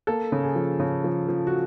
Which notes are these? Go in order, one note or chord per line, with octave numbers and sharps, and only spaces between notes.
A#3 A4
C#3
G#4
F3
C#3
F3
F3
F#4